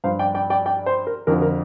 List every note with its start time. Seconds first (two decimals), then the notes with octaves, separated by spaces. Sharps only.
0.04 G2 F3 C5 F5
0.19 D5 G5
0.34 D5 G5
0.50 D5 G5
0.66 D5 G5
0.86 C5
1.07 A#4
1.27 F2 D3 F3 A#4
1.42 A#4